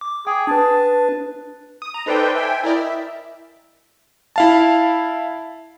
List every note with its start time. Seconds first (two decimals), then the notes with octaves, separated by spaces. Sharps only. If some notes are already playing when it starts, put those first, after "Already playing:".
0.01 D6
0.27 G#4 G5
0.47 D4 B4 A5
1.82 D#6
1.94 A#5
2.06 D#4 A4 B4 C5 D5 G5
2.35 E5 G5 G#5
2.63 E4 A#4 D5 D#5
2.76 E5
4.36 E4 F5 A5